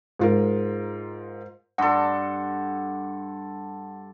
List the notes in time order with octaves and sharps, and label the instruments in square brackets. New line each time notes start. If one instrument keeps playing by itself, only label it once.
[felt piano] G#2 F4 A#4
[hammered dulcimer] G2 A4 [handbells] F#5 C6